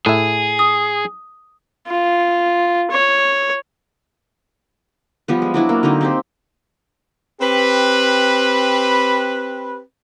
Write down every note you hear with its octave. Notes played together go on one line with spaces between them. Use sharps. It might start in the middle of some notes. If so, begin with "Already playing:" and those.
A2 G#4 E5
D#6
F4
C#5
F3 G3 B3
G#3
F#3 D4 E4 F#4
A#3
D3 F#3 C4 D#4
C4 G4 C5
C4 G4 B4